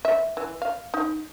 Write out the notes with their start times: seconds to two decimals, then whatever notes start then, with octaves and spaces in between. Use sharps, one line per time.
0.05 E5
0.37 E3
0.62 F5
0.94 D#4